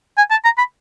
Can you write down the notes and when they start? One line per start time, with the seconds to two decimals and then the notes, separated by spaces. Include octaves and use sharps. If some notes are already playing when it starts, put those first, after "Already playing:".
0.17 G#5
0.31 A5
0.44 A#5
0.58 B5